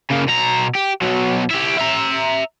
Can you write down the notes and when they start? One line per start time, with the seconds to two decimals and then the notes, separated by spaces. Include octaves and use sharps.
0.11 C#3 A#3
0.28 B2 A#5
0.75 G4
1.02 B2 F#3
1.51 E4 G4
1.78 E5 A#5